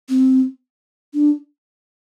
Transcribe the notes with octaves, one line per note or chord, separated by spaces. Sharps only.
C4
D4